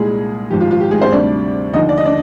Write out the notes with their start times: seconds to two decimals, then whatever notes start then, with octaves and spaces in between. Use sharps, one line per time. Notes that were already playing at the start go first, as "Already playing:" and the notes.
Already playing: C2 A#2 G3 G#3 G#4
0.50 G#1 G#2 F3 G4
0.61 F4
0.71 F4
0.80 G4
0.91 G#3 G#4
1.02 C4 C5
1.12 D2 C3 G3 D4 D5
1.73 D#2 D3 F3 D#4 D#5
1.89 D5
1.97 D#5
2.05 D4 D5